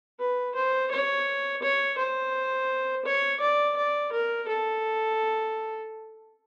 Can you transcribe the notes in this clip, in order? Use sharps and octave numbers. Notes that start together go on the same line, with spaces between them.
B4
C5
C#5
C#5
C5
C#5
D5
D5
A#4
A4